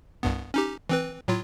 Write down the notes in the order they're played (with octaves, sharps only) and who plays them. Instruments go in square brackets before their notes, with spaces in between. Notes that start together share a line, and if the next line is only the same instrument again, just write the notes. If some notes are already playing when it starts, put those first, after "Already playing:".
[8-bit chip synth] C2 G2 B3
C#4 D#4 G4
E3 C4 B4
A2 F#3 F4